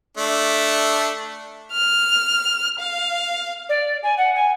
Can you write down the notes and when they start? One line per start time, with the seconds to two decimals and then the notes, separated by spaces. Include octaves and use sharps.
0.17 A3 D4
1.71 F6
2.79 F5
3.69 D5
4.03 G#5
4.17 F#5
4.35 G#5